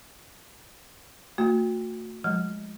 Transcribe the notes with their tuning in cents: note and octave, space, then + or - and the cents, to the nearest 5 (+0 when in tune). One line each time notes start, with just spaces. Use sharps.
A3 +30 F#4 -30
F3 +25 G#3 +0